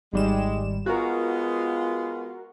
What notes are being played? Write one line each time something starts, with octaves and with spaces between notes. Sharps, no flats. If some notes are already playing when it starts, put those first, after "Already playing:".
G#1 G3 G#3 E7
G#3 B3 F4 F#4 A#4